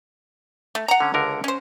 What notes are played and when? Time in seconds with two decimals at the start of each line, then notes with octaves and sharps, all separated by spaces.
0.75 A3
0.88 F#5 A#5
1.00 D3 C#4
1.14 C#2 D3 A#4
1.44 C#4 C5